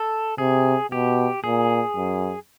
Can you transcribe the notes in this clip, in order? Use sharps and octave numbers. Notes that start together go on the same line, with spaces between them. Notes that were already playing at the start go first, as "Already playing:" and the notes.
Already playing: A4
C3 G#4
B2 G4
A#2 G#4
F#2